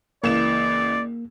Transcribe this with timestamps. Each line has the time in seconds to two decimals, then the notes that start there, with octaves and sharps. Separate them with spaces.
0.24 C#2 E3 A#3 D5 E7